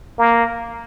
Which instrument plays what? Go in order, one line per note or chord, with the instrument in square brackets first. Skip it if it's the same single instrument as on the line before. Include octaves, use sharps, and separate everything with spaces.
[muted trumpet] A#3